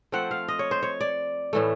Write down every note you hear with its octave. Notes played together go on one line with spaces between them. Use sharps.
F3 A3 C4 F#5
F5
D#5
C#5
C5
C#5
D5
A2 E3 A3